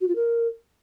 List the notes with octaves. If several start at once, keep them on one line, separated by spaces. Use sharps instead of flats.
F#4
F4
A#4